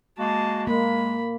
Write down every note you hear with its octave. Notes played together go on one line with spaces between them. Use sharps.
G#3 A#3 F#4 A5
G#3 A#3 B5